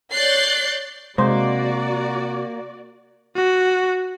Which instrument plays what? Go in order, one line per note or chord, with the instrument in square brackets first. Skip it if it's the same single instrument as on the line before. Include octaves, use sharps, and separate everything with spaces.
[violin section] C#5 D5 F#6 G6 A6 C7
[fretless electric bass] C3 [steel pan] G#3 C5 [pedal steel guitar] A#3 [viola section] F#4 D5
[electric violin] F#4